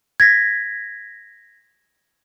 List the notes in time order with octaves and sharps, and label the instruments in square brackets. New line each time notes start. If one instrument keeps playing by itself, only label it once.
[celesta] G#6 A#6 B6